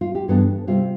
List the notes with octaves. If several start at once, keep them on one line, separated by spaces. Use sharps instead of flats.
F4
G4
G2 E3 B3 D4 A4
C3 G3 C4 F4